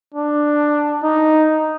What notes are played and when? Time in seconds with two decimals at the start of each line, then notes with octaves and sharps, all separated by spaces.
0.14 D4
1.03 D#4